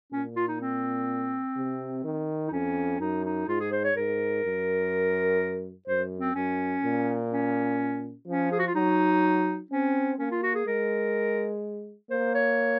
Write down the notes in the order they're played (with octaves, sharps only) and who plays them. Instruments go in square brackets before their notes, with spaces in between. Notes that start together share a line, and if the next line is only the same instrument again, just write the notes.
[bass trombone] A#2 [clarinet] C#4
[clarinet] F4
D#4
C4
[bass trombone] C3
D#3
[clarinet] D#4
[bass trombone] F2 [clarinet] C#4
[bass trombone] F#2 [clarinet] D#4
[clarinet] D#4
[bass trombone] G#2 [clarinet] F4
[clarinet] G#4
C5
C#5
[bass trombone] G#2 [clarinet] A#4
[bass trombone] F#2
[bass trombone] F#2 [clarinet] C5
[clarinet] C4
[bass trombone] F#2 [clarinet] C#4
[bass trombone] A#2
[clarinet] C#4
[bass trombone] F3 [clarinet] C#4
[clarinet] G#4
F#4
F4
[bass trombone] F#3 [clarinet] D#4
[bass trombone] C4 [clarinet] C#4
[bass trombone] A#3 [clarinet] C#4
[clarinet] F4
F#4
G#4
[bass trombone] G#3 [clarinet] A#4
[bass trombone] A#3 [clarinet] C5
[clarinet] C#5